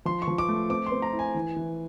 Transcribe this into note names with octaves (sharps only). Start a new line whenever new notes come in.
F3 C6
C#6
F3
D6
A3
C4 D6
C6
C4
A#5
E4
G#5
E3
E3